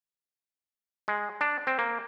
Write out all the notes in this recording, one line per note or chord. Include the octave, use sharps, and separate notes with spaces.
G#3
D4
C4
A#3